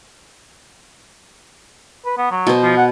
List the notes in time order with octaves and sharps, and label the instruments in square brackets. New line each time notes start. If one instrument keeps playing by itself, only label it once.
[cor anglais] B4
B3
F#3
[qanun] B2 C5
[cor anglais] F3
F#5